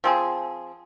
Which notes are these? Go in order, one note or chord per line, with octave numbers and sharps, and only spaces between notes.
F3 C4 G#4